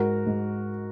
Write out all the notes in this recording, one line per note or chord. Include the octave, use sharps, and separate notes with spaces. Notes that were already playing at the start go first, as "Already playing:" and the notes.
Already playing: G#2 F#4 A#4
G#2